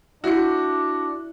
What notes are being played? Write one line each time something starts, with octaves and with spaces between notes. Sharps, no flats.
D4 E4 F#4 G6 C#7